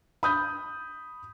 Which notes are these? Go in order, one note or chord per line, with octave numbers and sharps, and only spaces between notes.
B5 D#6 G6